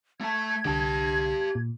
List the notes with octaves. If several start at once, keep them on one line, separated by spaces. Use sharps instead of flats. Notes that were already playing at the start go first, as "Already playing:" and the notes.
A3 A5 G#6
C2 D3 G4 A5
A#2